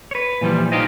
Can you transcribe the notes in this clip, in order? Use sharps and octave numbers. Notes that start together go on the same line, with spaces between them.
B4 C#5
A#2 E3 F3 G3
D#4 F4 G4 C5 D#5